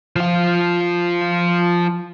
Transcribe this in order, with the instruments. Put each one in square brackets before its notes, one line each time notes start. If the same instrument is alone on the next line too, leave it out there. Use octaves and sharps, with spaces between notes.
[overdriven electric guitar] F3 F4